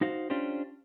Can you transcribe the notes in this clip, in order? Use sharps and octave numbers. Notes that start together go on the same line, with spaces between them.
D#4 F#4 C5 F5
C#4 D4 F4 G4 C5